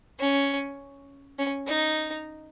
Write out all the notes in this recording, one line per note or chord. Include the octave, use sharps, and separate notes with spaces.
C#4
C#4
D#4